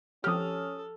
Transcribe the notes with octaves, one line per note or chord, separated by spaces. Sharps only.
F3 C#4 G4 A4 D#6 F6